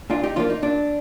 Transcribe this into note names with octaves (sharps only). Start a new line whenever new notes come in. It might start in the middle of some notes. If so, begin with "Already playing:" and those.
A#2 D4 F4
D#4 G4
F3 A#3 D4 F4
D#4
A#2 D4